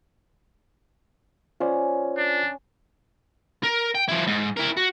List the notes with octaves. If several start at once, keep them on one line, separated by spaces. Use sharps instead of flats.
C#4 F4 C5 D5
D4
A#4
G5
F3 E4
G#2
E4 A#4
F#4